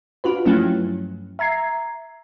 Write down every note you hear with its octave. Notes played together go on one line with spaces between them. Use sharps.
D4 F4 F#4 B4
G2 F3 F#3 A3 C#4 E4
E5 A#5 G#6 C7